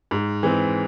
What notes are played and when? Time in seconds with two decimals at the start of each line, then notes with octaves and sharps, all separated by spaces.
0.11 G#2
0.43 E3 G#3 C4